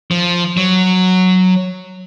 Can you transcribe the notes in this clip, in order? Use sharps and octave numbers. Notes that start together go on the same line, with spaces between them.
F3
F#3